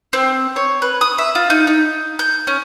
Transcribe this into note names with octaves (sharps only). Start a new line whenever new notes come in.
C4
C#5
B4
D#6
E5
F4
D#4
D#4
G6
C#4